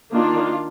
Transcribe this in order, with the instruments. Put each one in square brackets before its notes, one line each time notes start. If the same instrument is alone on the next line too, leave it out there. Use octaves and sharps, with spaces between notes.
[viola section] D#3 A#3 D4 F4